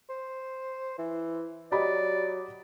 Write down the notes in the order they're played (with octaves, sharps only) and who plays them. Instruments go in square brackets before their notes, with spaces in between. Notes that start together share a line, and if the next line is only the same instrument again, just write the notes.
[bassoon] C5
E3
[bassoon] F#3 [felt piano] G4 D#5 B5 [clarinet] D5